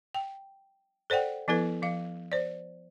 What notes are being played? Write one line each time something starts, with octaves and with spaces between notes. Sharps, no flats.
G5
A4 C5 D5 F#5 G5
F3 B3 E4 A4 B4
F3 F5
C5 D5